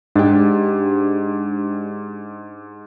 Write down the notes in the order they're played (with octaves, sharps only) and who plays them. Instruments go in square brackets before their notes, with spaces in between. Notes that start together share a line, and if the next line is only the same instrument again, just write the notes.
[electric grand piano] G#2 [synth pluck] D4 G4